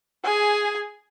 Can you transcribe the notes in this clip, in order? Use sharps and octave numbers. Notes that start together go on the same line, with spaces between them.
G#4 G#5